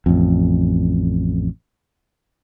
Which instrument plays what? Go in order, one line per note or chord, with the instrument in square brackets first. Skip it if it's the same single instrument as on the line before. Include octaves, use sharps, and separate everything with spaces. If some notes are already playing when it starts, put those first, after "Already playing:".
[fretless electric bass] A1 F2